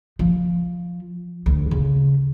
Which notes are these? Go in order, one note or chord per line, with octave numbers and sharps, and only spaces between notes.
F3
D2
C#3